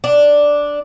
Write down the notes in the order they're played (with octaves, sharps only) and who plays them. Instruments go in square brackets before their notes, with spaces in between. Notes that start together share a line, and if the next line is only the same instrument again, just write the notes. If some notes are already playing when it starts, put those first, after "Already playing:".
[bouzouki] D4